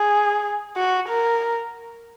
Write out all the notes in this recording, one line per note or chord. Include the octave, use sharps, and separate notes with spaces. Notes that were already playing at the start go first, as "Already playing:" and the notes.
Already playing: G#4
F#4
A#4